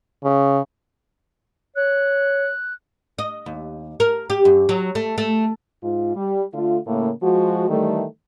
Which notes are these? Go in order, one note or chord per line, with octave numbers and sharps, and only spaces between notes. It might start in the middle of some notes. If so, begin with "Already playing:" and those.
C#3
C#5 F#6
D#5
D#2
A#4
G4
F#2
F#3
A3
A3
G#2 F4
G3
D3 A3 F4
A2 C#3 A#3
F3 G#3 F#4
D#3 E3 G3 A3